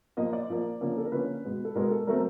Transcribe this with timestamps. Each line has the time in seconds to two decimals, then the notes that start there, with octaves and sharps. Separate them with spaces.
0.17 A#2 F3 A#3 D#5
0.33 D5
0.49 A#2 F3 A#3
0.81 D3 F3 A#3 C#4
0.98 A4
1.05 A#4
1.12 D3 F3 A#3 C#4 B4
1.44 B2 G#3 B3
1.65 A4
1.75 B2 G#3 B3 A#4
1.91 A4
2.07 F#3 A3 C4 A#4